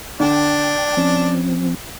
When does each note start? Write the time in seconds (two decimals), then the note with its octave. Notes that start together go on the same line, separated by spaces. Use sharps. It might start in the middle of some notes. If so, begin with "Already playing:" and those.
0.20 D3 D4 G5
0.97 F3 C4 C#4